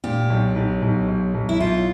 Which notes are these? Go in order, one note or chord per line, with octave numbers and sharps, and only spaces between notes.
A#2 G4
B1
B1
B1
B1
B1
E4
B1 F4